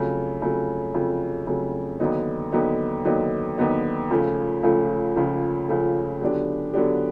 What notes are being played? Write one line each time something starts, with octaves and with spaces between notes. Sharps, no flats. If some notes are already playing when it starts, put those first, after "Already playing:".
Already playing: F2 C#3 F#3 A3
F2 C#3 F#3 A3
F2 C#3 F#3 A3
F2 C#3 F#3 A3
D#2 D3 F#3 B3 D#4
D#2 D3 F#3 B3 D#4
D#2 D3 F#3 B3 D#4
D#2 D3 F#3 B3 D#4
C#2 C#3 F3 A3
C#2 C#3 F3 A3
C#2 C#3 F3 A3
C#2 C#3 F3 A3
D3 F#3 B3 D4 G4
D3 F#3 B3 D4 G4